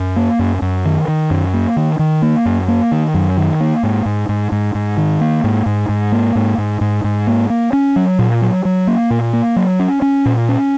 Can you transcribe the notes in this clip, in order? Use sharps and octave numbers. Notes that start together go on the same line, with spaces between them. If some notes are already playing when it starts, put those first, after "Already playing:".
Already playing: F#2
A#3
F#2
F#2
D#3
D#3
F#2
A#3
D#3
D#3
A#3
F#2
A#3
D#3
F#2
D#3
A#3
G#2
G#2
G#2
G#2
G#2
D#3
A#3
G#2
G#2
G#2
A#3
G#2
G#2
G#2
G#2
A#3
A#3
C#4
F#3
A#2
F#3
F#3
A#3
A#2
A#3
F#3
C#4
C#4
A#2
C#4